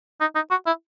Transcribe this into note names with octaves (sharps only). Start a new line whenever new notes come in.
D#4
D#4
F#4
E4